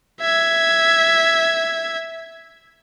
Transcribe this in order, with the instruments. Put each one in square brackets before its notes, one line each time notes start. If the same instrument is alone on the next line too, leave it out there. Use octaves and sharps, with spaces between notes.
[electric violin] E5 G#6